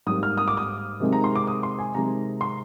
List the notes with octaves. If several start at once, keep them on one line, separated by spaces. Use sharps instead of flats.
G#2 G3 A#3 D#6
F6
D#6
D6
D#6
C3 D#3 G#3
A#5
C6
D6
D#6
C6
G#5
C3 D#3 G#3 A#5
C6